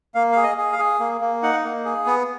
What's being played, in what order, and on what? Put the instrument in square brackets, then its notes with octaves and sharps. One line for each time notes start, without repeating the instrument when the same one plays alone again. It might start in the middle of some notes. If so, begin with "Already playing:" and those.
[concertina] A#3 F5
G#4 F5
D#5
G#4
F5
G#4
A#3
A#3
D#4 F#5
A#3
G#4
B3